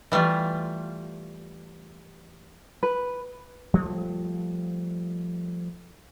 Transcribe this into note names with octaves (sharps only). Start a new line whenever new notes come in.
E3 G3 A3 F4
B4
F3 G3 A3